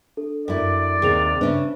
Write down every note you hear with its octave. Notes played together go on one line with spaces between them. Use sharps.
D4 A4
F#2 E4 D5
D#2 C3 G#4 A6 F7
C#3 C#4 D4 B4 C5 E5